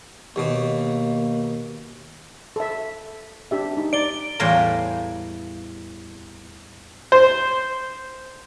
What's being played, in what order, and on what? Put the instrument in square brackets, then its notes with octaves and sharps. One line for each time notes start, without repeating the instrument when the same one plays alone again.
[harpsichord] D#2 B2 D#6 [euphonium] A#3
[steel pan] A4 E5
D4 G4 E5
D#4
[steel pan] D5 [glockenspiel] D7 G7
[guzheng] E2 A2 G3 F4 A#5
[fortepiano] C5